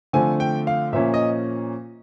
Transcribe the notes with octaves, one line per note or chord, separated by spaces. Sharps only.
D3 F3 A3 C4 G#5
G5
F5
A#2 F3 A#3 C#4 E5
D#5